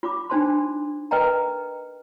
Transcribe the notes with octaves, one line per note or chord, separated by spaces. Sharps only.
F4 B5 D6
D4 D#4 C5 A5 C6
A#4 B4 D#5 G5 A#5